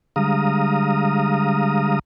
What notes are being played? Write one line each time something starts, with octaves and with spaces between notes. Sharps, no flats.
D3 G3 G#3 F5 A#5 D#6